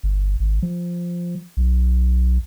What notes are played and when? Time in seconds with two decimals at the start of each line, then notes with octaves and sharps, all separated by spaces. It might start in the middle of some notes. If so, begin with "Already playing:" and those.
0.03 G1
0.40 G#1
0.62 F3
1.57 B1